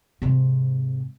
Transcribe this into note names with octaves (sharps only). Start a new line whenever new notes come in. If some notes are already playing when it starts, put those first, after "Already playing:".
G#2 C3